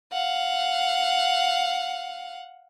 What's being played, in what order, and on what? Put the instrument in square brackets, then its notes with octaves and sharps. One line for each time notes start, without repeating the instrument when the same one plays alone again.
[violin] F5 F#5